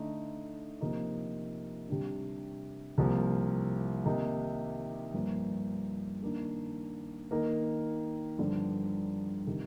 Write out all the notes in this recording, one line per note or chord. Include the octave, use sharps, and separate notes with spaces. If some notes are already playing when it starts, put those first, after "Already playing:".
Already playing: D3 A3 D#4
C3 F3 A#3 D#4
C3 G3 D4
C2 C3 F3 A#3
C3 D#3 A#3 D#4
G2 F3 A#3
D#3 A#3 D4
D#3 A#3 D#4 A#4
G2 D3 F3
C3 D#3